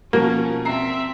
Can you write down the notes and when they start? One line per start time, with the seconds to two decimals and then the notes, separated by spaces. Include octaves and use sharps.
0.13 B2 F3 A#3 C#4 A#4
0.65 C4 E5 A#5 C7